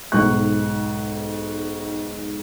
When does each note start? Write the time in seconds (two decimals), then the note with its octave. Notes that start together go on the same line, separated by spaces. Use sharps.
0.12 B1 G#2 C#6 F#6